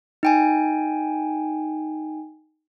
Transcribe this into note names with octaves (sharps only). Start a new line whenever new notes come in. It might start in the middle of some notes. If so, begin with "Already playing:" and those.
D#4 G5 G#5